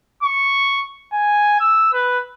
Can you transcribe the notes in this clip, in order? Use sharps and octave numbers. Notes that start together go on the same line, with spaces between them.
C#6
G#5
E6
B4